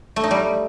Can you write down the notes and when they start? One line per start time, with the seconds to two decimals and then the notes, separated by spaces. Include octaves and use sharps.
0.16 A3
0.24 D#4
0.31 G3